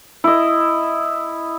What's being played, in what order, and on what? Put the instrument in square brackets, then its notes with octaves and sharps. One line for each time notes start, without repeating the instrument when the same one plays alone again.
[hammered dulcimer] E4 D#5